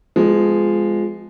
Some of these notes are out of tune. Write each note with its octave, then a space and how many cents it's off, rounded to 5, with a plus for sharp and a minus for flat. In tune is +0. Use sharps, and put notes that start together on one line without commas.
F3 +0 G#3 +0 B3 +40